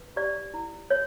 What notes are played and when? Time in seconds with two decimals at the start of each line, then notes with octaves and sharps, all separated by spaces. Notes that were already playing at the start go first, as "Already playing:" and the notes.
Already playing: B4
0.16 G4 D5
0.54 E4
0.90 C#5